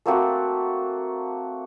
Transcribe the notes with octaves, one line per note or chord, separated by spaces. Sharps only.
A3 A#3 C4 F#4